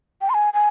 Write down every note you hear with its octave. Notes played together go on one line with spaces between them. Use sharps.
G5
C6
G#5
G#5